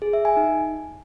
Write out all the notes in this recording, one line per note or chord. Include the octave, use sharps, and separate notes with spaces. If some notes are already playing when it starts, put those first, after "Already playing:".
G#4
E5
G#5
D#4